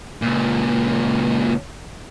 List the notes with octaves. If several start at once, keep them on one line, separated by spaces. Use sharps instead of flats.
C#2 A#2